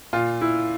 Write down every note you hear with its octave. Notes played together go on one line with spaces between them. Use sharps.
A#2 F4
E4